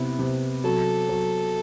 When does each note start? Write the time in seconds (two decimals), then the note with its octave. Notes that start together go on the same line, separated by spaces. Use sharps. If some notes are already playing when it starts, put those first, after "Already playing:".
Already playing: C3 B3 E4
0.19 C3
0.64 F#3 A4
1.09 F#3